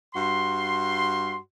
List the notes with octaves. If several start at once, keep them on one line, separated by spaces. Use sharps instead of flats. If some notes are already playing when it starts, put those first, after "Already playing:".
G2 F#4 C6